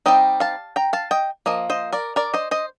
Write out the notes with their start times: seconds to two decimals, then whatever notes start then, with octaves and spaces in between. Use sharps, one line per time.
0.06 G3 C4 D#4 D#5 G5
0.40 F5 A5
0.76 G5 A#5
0.93 F5 A5
1.11 D#5 G5
1.46 F3 A#3 D#5
1.70 C5 D#5
1.92 A#4 D5
2.16 A#4 D5
2.34 C5 D#5
2.51 C5 D#5